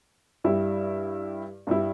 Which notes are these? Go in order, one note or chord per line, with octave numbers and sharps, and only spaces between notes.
G2 G3 E4
G2 G3 E4